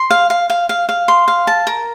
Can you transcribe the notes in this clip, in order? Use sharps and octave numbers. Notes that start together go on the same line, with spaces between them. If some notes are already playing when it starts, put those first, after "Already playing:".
Already playing: C6
F5
F5
F5
F5
F5
C6
F5
A5
A#4